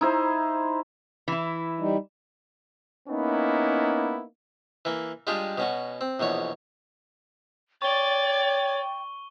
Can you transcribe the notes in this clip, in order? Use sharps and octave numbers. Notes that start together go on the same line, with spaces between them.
D#4 E4 C5
E3 E4
G3 D#4
A#3 B3 C#4 D#4 E4
E3 A#3
G3 G#3 D4 F4 G4 D#5
B2 C#4 F#4
C4
A#1 E2 B2 C#5
C#5 D5 G5 C#6 A6 G7